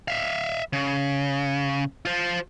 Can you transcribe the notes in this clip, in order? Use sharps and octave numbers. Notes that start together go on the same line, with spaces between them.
E5 F5
C#3
F4 C5